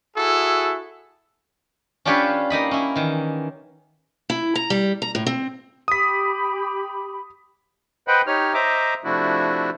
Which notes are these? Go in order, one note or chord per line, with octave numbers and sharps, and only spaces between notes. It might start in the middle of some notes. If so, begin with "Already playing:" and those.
E4 F#4 G#4 A4
C#4 D4 F4 G4 B4 C#5
A#3 D#4 D#5 B5
C#4 E4
D#3 E3
E4
A#5
G3
A#5
A2
C4
G4 B5 D#6 B6
B4 C5 D#5 F#5 G5 B5
D#4 G4 C#5 F6
C5 D#5 E5 A#5 D6
C3 F3 A3 D4 E4 F#4